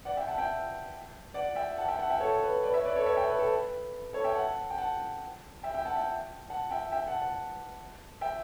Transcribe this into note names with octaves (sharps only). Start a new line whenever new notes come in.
D5 F#5
E5 G5
F#5 A5
E5 G5
D5 F#5
E5 G5
F#5 A5
E5 G5
F#5 A5
E5 G5
A4 C#5
B4
B4 D5
C#5 E5
B4 D5
A4 C#5
C#5 E5
E5 G5
B4
A4
B4
A4 C#5
E5 G5
F#5 A5
G5
F#5 A5
E5 G5
E5 G5
F#5 A5
E5 G5
F#5 A5
E5 G5
E5 G5
F#5 A5
F#5 A5
E5 G5